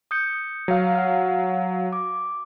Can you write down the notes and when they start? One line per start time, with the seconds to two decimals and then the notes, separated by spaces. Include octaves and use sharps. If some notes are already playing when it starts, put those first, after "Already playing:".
0.11 D#6 G6 C#7
0.68 F#3 F5
0.95 F#5 F6
1.92 D6